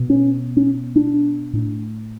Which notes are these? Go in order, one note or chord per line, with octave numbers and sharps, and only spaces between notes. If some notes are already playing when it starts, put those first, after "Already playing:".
Already playing: B2
C#4
C#4
D4
A2